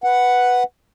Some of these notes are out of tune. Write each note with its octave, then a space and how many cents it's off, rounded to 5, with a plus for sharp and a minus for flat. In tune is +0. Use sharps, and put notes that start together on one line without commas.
B4 +0 F#5 +0